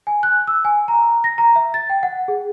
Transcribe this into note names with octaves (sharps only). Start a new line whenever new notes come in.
G#5
F#6
E6
G#5
A#5
A#6
A#5
E5
A6
G5
F#5
G#4